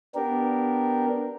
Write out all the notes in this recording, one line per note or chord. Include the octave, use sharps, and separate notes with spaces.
B3 D4 G4 A#4